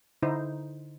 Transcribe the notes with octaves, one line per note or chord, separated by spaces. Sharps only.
D3 D#4 E4 C5